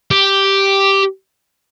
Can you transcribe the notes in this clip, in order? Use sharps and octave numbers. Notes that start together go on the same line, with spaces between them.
G4